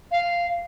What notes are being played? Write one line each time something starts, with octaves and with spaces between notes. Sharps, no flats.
F5